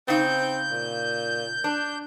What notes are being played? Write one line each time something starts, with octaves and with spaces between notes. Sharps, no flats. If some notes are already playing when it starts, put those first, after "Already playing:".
C#3 C4 D#4 G6
A#2
D4